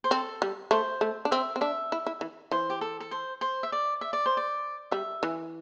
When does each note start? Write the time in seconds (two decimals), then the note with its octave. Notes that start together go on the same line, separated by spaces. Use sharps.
0.04 C5
0.11 C4 A4
0.42 G3
0.71 A3 C5
1.01 A3
1.25 D4
1.31 C4 E5
1.56 C4
1.61 D4 E5
1.92 E4
2.06 E4
2.21 E3
2.51 E3 C5
2.70 G4
2.81 A4
3.00 A4
3.11 C5
3.41 C5
3.63 E5
3.72 D5
4.01 E5
4.13 D5
4.26 C5
4.37 D5
4.91 G3 E5
5.23 E3